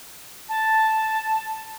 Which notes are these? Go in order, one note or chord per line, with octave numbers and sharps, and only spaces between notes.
A5